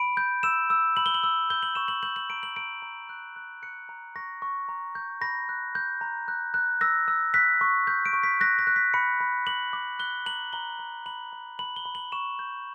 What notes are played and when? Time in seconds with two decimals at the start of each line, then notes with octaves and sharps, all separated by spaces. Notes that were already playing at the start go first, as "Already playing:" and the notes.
Already playing: B5 D7
0.17 G6
0.43 E6 E7
0.70 E6
0.97 B5 F#7
1.06 G7
1.14 F#7
1.23 E6
1.50 G6 G7
1.63 F#7
1.75 C#6 E7
1.88 F#7
2.03 G6 F#7
2.16 F#7
2.30 A#5 D7
2.43 F#7
2.56 A#5 D7
2.82 A#5
3.09 F#6
3.36 F#6
3.63 F#6 C#7
3.89 A#5
4.16 C#6 A#6
4.42 C#6
4.69 A#5
4.95 G6
5.21 B5 A#6
5.49 F#6
5.75 G6
6.01 A#5
6.28 F#6
6.54 F#6
6.81 E6 A#6
7.08 E6
7.34 F#6 B6
7.61 C#6
7.87 G6
8.05 D7
8.13 C#6
8.23 B6
8.40 F#6 A#6
8.59 A#6
8.67 F#6
8.76 B6
8.94 B5 C#7
9.21 B5
9.47 D6 F#7
9.73 D6
9.99 F#6 G7
10.26 A#5 F#7
10.53 A#5 G7
10.79 A#5
11.06 B5 F#7
11.33 B5
11.59 B5 F#7
11.76 G7
11.86 B5
11.95 F#7
12.12 C#6 E7
12.39 G6